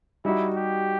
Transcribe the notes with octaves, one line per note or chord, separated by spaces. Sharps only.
G3 D#4 E4 F#4
G4